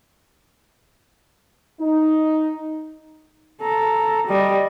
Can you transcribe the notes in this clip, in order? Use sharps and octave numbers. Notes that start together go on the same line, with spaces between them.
D#4
A4 A#5
G3 D#5